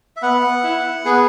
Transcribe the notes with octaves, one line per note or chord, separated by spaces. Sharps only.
E5
B3 F#5
E4
B3 G#4